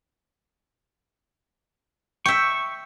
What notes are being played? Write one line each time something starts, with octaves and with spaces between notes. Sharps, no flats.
E5 G5 C#6